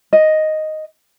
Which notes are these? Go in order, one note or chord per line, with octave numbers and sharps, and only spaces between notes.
D#5